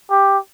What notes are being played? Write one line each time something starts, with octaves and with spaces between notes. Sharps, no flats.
G4